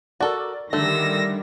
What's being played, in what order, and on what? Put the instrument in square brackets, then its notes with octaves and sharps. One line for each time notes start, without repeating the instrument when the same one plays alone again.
[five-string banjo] F#4 A4 [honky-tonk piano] A#4 D5
[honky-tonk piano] D3 [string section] D#3 G3 [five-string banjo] A3 [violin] E6 A#6